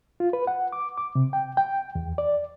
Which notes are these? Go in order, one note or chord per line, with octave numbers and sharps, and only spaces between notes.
F4
B4
F#5
D6
D6
C3
G5
G5
E2
D5